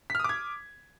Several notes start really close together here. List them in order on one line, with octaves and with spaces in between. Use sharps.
B6 F6 D#6 D6 G#6